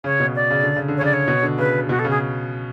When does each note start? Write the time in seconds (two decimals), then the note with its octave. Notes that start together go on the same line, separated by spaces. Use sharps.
0.04 C#3 C#5
0.20 B2
0.35 D5
0.50 C#3
0.63 D3
0.76 C#3
0.88 D3
0.97 C#5
1.01 C#3 D5
1.13 C#5
1.28 B2
1.43 D3
1.58 C#3 B4
1.89 B2 F#4
1.99 A4
2.05 C#3
2.10 G#4